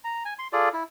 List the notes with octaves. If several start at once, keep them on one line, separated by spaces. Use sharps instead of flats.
A#5
G#5
C6
F4 G#4 A4 D5
E4